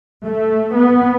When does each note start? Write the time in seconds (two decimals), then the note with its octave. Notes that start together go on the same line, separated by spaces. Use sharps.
0.24 A3
0.75 B3